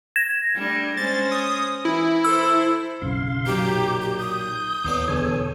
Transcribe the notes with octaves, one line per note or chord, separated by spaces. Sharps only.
G#6 A#6 E7
G3 A3 D4
G#3 C#4 C5 A6
D#6
E3 E4
A4 C5 E6
F#1 B1 C#3 F5 C6
A#2 D#3 F#3 G4 G6
G4
D#6
D#2 A2 B3 D5
E1 E2 D3 A4 C#5 G#5